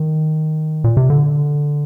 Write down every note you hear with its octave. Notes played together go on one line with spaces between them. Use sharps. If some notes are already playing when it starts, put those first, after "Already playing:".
Already playing: D#3
A#2
C3
D3